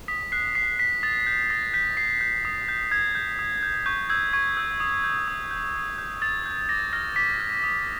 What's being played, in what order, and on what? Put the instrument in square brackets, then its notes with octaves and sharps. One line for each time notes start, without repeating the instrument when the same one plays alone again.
[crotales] D#6 B6
F#6 C7
D#6 C7
F#6 B6
D#6 A6
G6
D#6 A#6
G6 B6
D#6 C7
G6
D#6
G6
D#6 G#6
G6
D#6
G6
C#6 G6
E6 G6 G#6
C#6 G#6
E6 G6
D#6
G6
D#6
G6
D#6
G6
D#6 A6
G6
D6 A#6
F6 A#6
D6 B6
F6
D#6